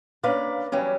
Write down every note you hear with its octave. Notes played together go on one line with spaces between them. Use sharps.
A#3 C#4 D4 B4 D5 F5
E3 F#3 G3 C#4